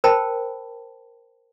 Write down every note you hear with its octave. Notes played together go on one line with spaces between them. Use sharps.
A#4 C5 G5 A5 B5